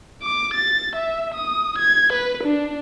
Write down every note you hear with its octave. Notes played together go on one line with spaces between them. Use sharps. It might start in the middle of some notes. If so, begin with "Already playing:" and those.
D6
A6
E5
D#6
G#6
B4
D4